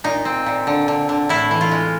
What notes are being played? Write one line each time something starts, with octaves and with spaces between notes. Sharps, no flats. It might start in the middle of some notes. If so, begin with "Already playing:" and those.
A#2 D#4
C4
A#2
D3
D3
D3
A2 E4
E3
F4
G#3